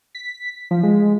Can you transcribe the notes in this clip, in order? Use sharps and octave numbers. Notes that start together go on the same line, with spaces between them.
B6
F3
G#3